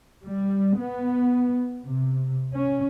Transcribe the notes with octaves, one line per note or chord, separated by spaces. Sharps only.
G3
B3
C3
C#4